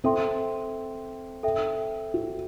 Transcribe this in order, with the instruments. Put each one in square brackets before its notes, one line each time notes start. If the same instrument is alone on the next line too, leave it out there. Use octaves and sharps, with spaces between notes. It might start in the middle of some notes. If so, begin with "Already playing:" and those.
[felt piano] C4 [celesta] A4 E5 G5 C6
[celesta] A4 E5 G5
[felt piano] F#4